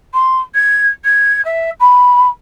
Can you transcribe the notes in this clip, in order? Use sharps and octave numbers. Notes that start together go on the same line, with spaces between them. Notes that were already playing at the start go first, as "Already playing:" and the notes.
C6
G#6
G#6
E5
B5